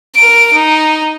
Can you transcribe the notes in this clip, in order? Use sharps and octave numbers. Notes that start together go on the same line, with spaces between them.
A#4 D7
D#4